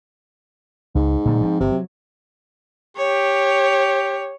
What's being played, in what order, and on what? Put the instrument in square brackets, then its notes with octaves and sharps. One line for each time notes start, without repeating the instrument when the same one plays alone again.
[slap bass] C#2 [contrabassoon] G#2
[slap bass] A#2 D3 G3
F3 A3 C4
[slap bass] G1 [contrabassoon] C3
[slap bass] F#3
[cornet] G4 [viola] C#5